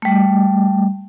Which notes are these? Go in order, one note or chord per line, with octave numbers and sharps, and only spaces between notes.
G3 A3